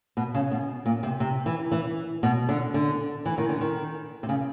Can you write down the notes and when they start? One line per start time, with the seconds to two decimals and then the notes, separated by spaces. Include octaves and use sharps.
0.17 B2
0.34 C#3
0.51 B2
0.86 A#2
1.03 C3
1.20 C3
1.46 E3
1.72 E3
2.23 B2
2.49 D3
2.74 D3
3.26 E3
3.38 D#3
3.49 D3
3.61 D#3
4.23 C3
4.29 C#3